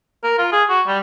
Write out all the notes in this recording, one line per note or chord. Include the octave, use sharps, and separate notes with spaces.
A#4
F4
G#4
F#4
G3